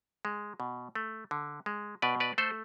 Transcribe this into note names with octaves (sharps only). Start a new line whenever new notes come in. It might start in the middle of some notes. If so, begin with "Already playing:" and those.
G#3
B2
A3
D3
G#3
B2 B4 D5
B4 D5
A3 A4 C5